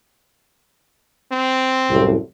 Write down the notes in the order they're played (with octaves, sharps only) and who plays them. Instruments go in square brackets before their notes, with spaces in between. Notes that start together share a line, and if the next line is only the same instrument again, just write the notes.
[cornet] C4
[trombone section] C2 F#2 A2